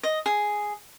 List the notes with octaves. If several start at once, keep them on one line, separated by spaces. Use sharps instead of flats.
D#5
G#4